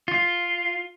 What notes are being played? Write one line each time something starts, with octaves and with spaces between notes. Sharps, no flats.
F4